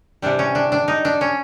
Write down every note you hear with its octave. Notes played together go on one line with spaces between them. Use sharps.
C3 E3 G3 D4
C#4
D4
D4
D#4
D4
C#4